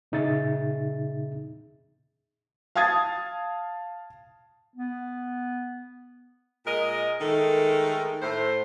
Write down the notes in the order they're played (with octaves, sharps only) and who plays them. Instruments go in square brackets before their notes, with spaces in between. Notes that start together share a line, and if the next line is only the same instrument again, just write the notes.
[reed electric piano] A#2 C#3 D#4 G#4 E5 A6
[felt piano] F5 A5 D#6 G#6 A6
[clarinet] B3
[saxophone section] A#2 G#3 A#4 D#5
D#3 G#3 A3 A4 A#4
A2 A3 C5